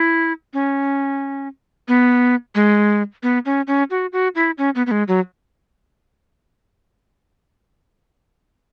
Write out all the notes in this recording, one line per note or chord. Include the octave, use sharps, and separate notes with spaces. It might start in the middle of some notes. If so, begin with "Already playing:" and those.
Already playing: E4
C#4
B3
G#3
B3
C#4
C#4
F#4
F#4
E4
C#4
B3
B3
G#3
F#3